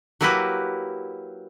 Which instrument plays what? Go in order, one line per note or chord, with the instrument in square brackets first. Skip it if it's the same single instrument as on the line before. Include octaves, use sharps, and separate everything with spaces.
[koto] F#3 A#3 E4 F#4 G4 B4